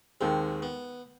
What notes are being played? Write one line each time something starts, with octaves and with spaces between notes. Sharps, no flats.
D#2 D#3 G#3 C4
B3